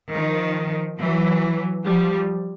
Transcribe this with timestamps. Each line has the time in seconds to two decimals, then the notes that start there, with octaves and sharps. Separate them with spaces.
0.14 D#3 F3
0.99 E3 F#3
1.85 F3 G3